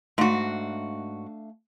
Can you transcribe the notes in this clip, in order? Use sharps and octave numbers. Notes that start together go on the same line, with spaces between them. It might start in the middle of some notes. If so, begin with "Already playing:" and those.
G#2 A3 D4 F#4 F5